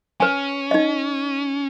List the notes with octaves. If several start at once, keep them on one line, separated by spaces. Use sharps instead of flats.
C#4 B4 G#5
D#4 D#5